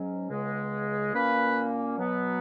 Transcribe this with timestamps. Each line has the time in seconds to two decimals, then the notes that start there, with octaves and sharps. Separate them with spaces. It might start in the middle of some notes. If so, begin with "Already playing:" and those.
Already playing: G#2 F#3 C#4
0.28 C#2 C#3 G#3 B3
1.13 A#2 A#3 C#4 B4
1.97 B2 F#3 B3